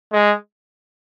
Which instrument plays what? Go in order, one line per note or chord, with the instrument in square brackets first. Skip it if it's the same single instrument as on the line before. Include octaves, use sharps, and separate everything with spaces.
[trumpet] G#3